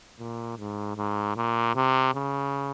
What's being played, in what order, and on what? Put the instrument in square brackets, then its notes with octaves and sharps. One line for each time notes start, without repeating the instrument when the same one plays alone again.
[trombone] A#2
G#2
G#2
A#2
C3
C#3